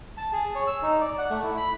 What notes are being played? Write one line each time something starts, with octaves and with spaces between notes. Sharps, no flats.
A5
G#4
C#5
E6
D#4
D5
F#5
A3
E4
B5